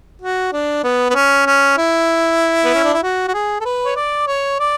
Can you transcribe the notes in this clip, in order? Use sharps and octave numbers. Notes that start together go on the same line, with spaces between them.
F#4
D4
B3
B3
C#4
C#4
E4
B3
C#4
D4
E4
F#4
F#4
G#4
A4
B4
C#5
D5
C#5
D5